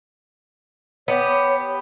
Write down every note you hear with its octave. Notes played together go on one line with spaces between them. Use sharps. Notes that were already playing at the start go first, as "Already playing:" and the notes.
B3 G4 C#5